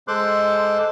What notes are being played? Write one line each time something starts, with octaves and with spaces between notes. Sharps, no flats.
G#3 A4 C5 C6 D6 F#6